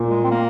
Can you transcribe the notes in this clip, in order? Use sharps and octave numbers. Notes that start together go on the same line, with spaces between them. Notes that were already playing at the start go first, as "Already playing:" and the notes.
Already playing: A#2
G#3
C4
A#3